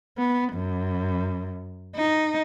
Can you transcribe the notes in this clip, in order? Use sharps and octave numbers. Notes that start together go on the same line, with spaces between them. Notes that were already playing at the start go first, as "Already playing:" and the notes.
B3
F#2
D#4